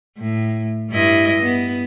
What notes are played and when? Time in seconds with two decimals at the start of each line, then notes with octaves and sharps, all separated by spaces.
0.18 A2
0.90 G2 E4 D#5
1.42 B3